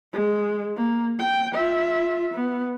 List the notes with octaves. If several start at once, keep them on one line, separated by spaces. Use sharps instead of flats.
G#3
A#3
G5
F4 E5
B3